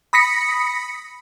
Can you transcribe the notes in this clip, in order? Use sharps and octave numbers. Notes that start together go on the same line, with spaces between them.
B5 D#6 A#6 B6 C#7